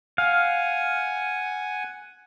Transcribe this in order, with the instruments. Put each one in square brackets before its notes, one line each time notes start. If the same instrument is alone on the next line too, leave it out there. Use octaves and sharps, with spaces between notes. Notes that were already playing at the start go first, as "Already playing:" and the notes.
[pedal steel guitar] F5 [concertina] F#5 G#5